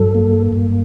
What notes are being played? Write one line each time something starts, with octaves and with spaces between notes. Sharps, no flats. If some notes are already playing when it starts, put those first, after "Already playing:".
Already playing: G2 F#3 A4
A#3
G2